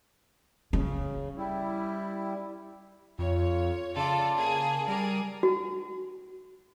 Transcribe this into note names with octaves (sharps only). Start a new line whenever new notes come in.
C#3 C#4
G3 E4
F2 F4 C#5
C#3 F4 A4 D5 A5
A#3 G#4
G3 G#4 A#4 D5
F#4